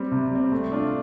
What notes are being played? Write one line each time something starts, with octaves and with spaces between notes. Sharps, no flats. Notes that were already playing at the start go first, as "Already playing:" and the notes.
Already playing: G3 C4
C3
G3 C4
A3
D4 F4